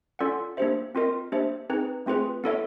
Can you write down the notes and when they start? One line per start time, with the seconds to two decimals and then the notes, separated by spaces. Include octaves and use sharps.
0.19 C#4 F4 A4 D5 F#5
0.57 A#3 D4 G4 C5 E5
0.95 C4 F4 A#4 D#5
1.32 A#3 D4 G4 C5 E5
1.70 C4 D#4 G#4 B4
2.06 A3 C4 F4 G#4 B4
2.44 B3 E4 A4 C#5 E5